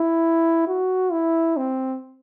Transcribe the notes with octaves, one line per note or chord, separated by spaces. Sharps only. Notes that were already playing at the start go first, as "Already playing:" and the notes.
Already playing: E4
F#4
E4
C4